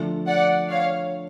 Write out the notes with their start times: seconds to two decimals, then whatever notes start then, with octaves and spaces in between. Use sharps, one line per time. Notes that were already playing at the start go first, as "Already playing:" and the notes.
Already playing: D3 F3 A3
0.27 D5 F#5
0.70 C#5 F5